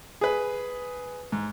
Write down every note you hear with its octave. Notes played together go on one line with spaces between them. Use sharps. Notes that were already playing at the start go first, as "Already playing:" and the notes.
G#4 B4
G#2